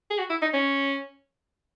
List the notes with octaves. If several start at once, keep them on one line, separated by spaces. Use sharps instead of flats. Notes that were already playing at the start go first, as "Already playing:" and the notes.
G#4
F#4
E4
D#4
C#4